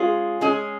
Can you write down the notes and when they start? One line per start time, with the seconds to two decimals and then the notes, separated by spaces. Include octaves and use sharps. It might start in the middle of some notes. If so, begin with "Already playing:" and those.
Already playing: G#3 C#4 F4 G#4
0.41 G#3 C#4 G#4